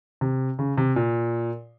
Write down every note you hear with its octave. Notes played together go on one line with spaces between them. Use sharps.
C3
C#3
C3
A#2